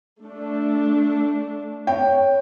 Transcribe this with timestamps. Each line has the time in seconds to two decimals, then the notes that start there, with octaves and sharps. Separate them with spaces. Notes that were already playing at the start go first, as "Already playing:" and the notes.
0.24 A3 D4
1.87 C#5 G5